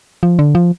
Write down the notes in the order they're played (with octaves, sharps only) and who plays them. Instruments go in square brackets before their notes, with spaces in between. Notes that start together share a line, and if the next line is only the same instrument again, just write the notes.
[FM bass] F3
D3
F3